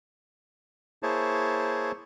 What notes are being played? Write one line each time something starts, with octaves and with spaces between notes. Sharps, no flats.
A#3 E4 G#4 C5 C#5 A5